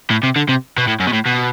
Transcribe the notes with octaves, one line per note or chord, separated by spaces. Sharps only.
A2
C3
D3
C3
B2
A2
F#2
B2
A2
B2